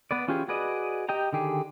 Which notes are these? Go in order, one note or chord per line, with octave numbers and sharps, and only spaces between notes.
B3 B4 D5
E3 C#4 F4 G4 G#4
F#4 G#4 B4 D5 D#5
G4 D#5 G5 A#5
D3 D#3 G4 G#4